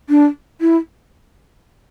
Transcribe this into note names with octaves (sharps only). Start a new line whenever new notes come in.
D4
E4